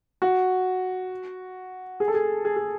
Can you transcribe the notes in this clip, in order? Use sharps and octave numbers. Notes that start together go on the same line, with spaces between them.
F#4
G#4
A4
G#4
G#4
G#4